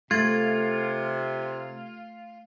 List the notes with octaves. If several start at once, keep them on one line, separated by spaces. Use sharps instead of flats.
C3 A3 F4 G#6 A6